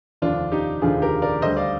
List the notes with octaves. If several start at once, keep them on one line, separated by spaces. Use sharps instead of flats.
F1 D#2 D3 F3 D4 F4
D#4 G4
F1 D#2 D3 F3 F4 G#4
G4 A#4
A#4 D5
D2 D3 G3 C5 D#5
D5 F5